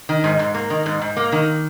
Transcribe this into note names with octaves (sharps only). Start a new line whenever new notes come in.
D#3
G#2
G#2
A#3
D#3
G#2
G#2
A#3
D#3